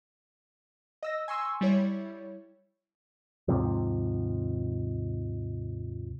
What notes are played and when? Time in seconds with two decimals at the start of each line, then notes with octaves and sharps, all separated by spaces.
1.03 D#5 E6 A#6
1.28 G#5 C6 C#6 E6
1.61 G3 E4 C#5
3.48 D#2 G#2 C3 F3